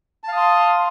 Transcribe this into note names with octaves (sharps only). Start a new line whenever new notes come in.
F5 A5 C6 D#6